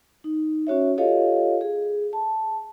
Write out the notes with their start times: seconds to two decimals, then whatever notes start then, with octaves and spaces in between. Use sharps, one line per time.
0.24 D#4
0.67 C#4 F#4 C#5 E5
0.98 F4 G4 A4 C#5 D#5 F5
1.61 G#4
2.13 A5